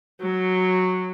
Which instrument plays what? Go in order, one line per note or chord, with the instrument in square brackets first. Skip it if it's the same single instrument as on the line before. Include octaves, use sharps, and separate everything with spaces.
[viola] F#3